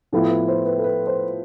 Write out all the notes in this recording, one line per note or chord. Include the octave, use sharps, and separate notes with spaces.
A2 F3 B3 E4 A4
B4
C5
B4
A4
B4
C5